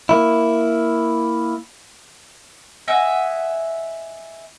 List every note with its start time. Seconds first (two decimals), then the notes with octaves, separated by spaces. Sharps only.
0.09 A#3 E4
2.88 D#5 E5 F#5 G#5